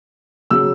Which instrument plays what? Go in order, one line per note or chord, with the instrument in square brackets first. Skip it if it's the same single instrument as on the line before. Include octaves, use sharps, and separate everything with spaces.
[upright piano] C#3 F#3 E6